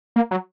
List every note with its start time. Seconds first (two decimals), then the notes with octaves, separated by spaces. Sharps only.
0.16 A#3
0.31 F#3